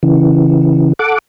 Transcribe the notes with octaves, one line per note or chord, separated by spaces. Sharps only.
C#3 E3
A4 F#5 D6